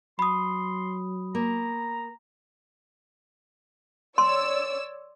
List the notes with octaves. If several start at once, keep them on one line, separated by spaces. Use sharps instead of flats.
F#3 B5 C6 D#6
A#3 A#5
C#5 D5 C6 E6